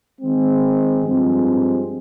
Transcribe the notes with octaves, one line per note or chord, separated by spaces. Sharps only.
D#3 G#3 C4
G2 F3 G#3 C4